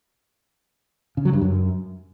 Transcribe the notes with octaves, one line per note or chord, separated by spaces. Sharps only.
C#3
F#3
G2
F#2